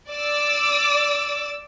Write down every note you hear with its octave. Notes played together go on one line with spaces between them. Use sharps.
D5 D6 E6